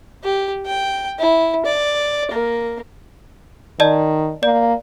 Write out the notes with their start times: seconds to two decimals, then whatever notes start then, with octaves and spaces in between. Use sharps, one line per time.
0.24 G4
0.66 G5
1.19 E4
1.66 D5
2.31 A#3
3.80 D#3 D5 D#5 A5
4.43 A#3 D5